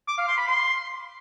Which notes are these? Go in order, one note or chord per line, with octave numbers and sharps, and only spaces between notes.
D6
F5
C6
B5
C6